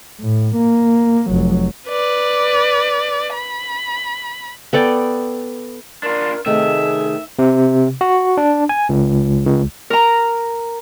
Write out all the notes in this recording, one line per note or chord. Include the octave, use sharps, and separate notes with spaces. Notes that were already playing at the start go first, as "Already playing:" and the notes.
A2
A#3
F1 F#3
B4 D5
B5
B3 A4 D5 G5
D4 F4 A#4
C3 D#3 A3 G#4 E5
C3
F#4
D4
G#5
C#2
C#2
A#4 A#5